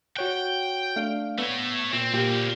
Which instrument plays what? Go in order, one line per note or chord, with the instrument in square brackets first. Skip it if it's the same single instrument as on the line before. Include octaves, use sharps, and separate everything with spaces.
[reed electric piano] F#4 C#5 F#6 [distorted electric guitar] G5
[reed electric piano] A3 D4 F5
[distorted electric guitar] A3 C#5 [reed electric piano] B3
[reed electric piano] A#2 [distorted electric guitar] C4
[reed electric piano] A#2 G4 [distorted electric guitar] A#3 C4